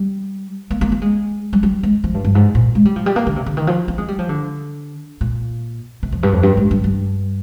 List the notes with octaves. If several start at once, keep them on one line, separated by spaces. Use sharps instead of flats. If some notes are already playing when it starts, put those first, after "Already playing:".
Already playing: G3
A#3
A#3
A#3
G#3
G3
G3
G#3
F3
G2
G2
G#2
A#2
G#3
G3
F3
G3
A#3
D3
C3
D3
D#3
F3
C4
G#3
G3
F3
D3
A#2
C3
F2
G2
F2
G2
G#2
G2
G2